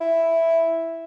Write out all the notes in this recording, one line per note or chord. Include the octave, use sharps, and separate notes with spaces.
E4